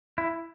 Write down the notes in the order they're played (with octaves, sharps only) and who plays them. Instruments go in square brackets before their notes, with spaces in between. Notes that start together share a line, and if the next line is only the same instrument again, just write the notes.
[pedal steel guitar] E4